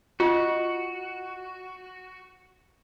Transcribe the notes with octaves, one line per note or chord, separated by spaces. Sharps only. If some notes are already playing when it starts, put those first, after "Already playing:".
D#4 F4 F#4